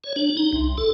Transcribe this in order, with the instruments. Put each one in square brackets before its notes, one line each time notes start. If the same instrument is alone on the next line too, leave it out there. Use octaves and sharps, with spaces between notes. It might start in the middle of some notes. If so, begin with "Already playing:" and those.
[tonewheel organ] C#5
D4
D#4
C2
A4